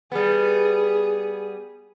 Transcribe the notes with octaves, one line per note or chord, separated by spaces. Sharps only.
G3 B3 G#4